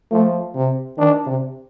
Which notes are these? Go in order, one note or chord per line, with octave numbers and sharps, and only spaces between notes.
F3 A3
C3
D#3 D4
C3